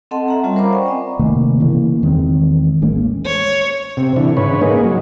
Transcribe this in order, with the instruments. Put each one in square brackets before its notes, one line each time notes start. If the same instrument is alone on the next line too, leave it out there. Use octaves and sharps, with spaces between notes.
[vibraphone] C4 A4 D#5 F#5 A5 C6
E5 F#5 A#5
G3 C#4 F4 C#5 E5 F#5
A#4 C5 F5 A#5 B5 D6
D5 G5 C#6
C4 D#5 G#5
[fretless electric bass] C3 D#3 A3 A#3
C#3 E3 A#3
E2 D#3 G#3 C4
A1 G#3 A#3 C#4
[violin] C#5
[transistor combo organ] C3
D3 E3
G#2 C#3 B4 C#5
A#3 D#4 G#4
F#3